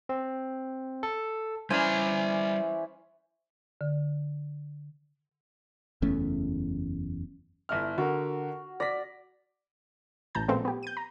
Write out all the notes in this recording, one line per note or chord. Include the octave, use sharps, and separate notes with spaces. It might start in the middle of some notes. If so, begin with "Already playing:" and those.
C4
A4
E3 G3 C#4 C5 D5 G#5 A#5
D3
F#1 E2 A3 C#4
G1 E4 F6
D3 F#4 A#4
D5 A#6 B6
A1 A5 A#5 G6
A#2 F3 G#3 A3 B3 C4
B3 G4
G6 D#7
A#5